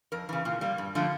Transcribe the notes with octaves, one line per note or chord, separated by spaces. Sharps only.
F2 A#4
C#3 E3
A#2
G3 A#3
G2
D3 F3 A3